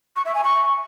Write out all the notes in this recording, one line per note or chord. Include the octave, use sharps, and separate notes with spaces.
C#6
E5
G#5
C#6